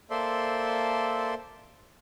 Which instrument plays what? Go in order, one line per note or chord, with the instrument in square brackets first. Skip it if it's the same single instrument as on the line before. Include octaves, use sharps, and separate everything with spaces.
[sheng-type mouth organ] A#3 A4 C5 D5 E5 C6